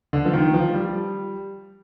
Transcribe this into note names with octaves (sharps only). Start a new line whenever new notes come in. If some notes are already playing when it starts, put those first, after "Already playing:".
D3
F3
D#3
F3
G3